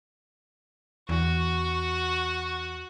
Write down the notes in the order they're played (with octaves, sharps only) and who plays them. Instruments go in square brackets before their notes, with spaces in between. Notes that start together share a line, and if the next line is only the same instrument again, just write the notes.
[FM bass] E2 [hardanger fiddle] F#4